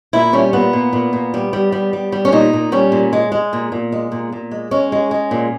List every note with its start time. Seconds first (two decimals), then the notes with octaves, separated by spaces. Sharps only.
0.13 A#2 E4
0.33 G3 C#4
0.53 A#2 B3
0.73 A#2
0.93 A#2
1.13 A#2
1.34 G3
1.53 G3
1.72 G3
1.93 G3
2.12 G3
2.25 C#4
2.32 A#2 D#4
2.53 A#2
2.72 G3 C#4
2.92 A#2
3.13 G#3
3.32 G#3
3.53 A#2
3.72 A#2
3.92 G#3
4.12 A#2
4.32 A#2
4.51 G#3
4.71 G#3 C#4
4.92 G#3
5.11 G#3
5.31 A#2